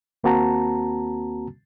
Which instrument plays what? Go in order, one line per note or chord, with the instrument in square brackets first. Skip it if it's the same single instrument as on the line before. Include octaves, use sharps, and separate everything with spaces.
[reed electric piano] D#2 A#3 C4 F#4 A5 A#5